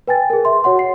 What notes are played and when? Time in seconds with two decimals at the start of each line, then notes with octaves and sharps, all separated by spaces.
0.08 B4 G5 G#5 A6
0.30 G#4 A#4
0.45 E5 C6
0.64 F#4 C#5 F#5 C6
0.79 C7